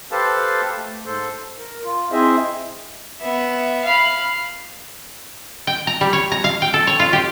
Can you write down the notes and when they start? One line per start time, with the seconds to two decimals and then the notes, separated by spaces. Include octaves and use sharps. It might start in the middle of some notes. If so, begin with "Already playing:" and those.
0.12 G4 A4 B4 C5 F5 A5
0.77 A3
1.06 G#2 A4 C5
1.58 A#4
1.84 F4
2.12 C4 E4 G#4 C5 D#5 E5
3.22 B3 E5
3.85 F5 B5
5.67 G5
5.87 A#5
6.01 G3
6.13 C#5
6.32 A#5
6.44 F5
6.62 G5
6.74 A4
6.87 C#5
7.00 F4
7.13 G4